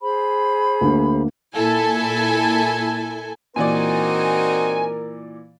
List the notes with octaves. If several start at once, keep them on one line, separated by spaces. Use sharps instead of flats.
G#4 C5 B5
D2 A#3
A#2 E4 A4 G#5
A#2 E3 C4 D#4 F#4 A#4 D5 G#5